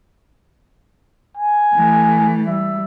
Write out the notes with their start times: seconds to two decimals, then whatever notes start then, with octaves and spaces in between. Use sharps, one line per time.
1.37 G#5
1.75 E3 A3
2.48 G3 E5